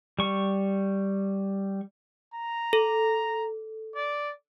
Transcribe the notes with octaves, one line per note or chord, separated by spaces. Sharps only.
G3 C#6
A#5
A4
D5